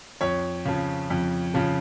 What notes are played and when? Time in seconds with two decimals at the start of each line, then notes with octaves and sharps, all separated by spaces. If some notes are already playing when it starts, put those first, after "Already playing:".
0.21 F2 C#5
0.65 C#3 F3
1.10 F2
1.54 C#3 F3